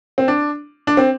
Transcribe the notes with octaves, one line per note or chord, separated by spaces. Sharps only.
C4
D4
D4
C4